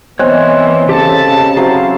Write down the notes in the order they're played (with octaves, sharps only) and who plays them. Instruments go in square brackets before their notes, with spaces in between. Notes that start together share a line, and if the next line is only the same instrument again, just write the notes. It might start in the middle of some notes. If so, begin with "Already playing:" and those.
[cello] E3 B3 [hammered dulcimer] C4 D#5 G#5 [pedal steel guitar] C#5 F#6
[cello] C#3 [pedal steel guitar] G4 A4 [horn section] A5
[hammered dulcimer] F#3 C4 E4 [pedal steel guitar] G#4 F5